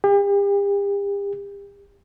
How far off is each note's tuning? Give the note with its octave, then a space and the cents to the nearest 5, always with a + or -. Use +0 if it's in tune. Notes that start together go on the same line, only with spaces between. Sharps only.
G4 +40